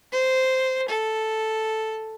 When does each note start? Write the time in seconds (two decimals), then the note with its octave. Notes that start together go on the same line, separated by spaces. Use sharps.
0.12 C5
0.88 A4